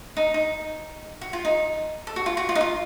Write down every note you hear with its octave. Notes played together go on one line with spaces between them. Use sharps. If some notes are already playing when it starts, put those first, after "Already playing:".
D#4
D#4
F#4
F4
D#4
A4
F#4
F4
F#4
F4
D#4
F4